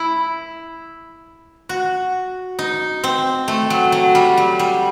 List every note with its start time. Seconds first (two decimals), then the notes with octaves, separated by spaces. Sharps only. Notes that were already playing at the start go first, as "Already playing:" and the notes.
Already playing: E4
1.69 F#4
2.59 D#4
3.04 C4
3.48 A3
3.70 F#3
3.92 F#3
4.15 G3
4.37 F#3
4.59 G3